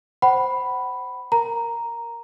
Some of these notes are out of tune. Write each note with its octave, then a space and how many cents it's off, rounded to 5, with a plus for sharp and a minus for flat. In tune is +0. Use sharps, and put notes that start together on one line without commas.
C5 +0 F#5 +30 B5 +0
A#4 +0 A#5 +0